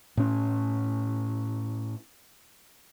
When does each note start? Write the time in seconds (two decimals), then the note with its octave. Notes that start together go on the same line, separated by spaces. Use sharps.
0.17 A2 C#4